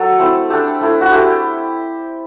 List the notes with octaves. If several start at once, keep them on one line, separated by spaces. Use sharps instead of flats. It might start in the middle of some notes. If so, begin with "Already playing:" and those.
Already playing: F#3 A4
A3 C4 E4
A3 D4 G4
A3 E4
F#4
A3 E4 G4